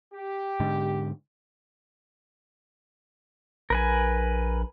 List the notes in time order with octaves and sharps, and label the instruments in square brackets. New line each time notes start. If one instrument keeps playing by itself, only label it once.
[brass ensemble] G4
[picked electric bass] G#2 D3
[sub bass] A#1 [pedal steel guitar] A#4 B4 G#5